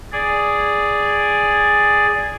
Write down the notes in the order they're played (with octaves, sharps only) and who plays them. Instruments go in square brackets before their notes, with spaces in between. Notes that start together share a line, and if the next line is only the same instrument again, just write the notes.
[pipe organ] G#4 D5